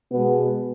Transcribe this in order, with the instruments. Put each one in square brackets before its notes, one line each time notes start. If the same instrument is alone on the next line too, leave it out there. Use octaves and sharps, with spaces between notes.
[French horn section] B2 G#3 B3